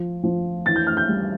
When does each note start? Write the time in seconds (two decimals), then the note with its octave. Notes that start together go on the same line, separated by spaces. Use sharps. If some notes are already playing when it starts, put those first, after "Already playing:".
Already playing: F3
0.23 F3
0.66 E3 A6
0.76 G6
0.87 F6
0.97 G6
1.08 G3